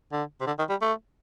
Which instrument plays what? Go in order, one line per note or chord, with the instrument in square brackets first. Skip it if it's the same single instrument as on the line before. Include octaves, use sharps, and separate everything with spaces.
[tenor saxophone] D3
C3
D3
D#3
G3
A3